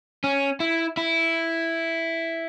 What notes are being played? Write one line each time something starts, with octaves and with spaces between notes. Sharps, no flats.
C#4
E4
E4